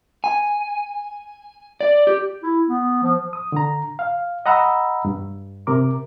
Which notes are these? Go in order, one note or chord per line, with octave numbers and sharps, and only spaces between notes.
G#5
D5
G4
E4
B3
F3
D#6
D3 A#5
F5
D#5 F#5 A#5 B5 E6
G2
C3 A#4 D6